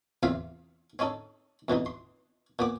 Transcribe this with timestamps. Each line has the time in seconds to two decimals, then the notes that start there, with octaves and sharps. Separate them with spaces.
0.23 E2 C3 F4 E5 F5 C6
0.99 C4 C#4 D#4 A4
1.68 F2 B2 E3 D#4
1.86 C6
2.59 A#2 B3 D6